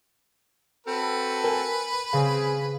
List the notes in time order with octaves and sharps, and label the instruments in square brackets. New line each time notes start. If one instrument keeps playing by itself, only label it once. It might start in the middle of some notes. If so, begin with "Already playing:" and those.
[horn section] C4 F#4 A4 [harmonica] B4
[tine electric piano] A#4 [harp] G#5
[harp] C#3 [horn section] C4 G#4 [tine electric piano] F5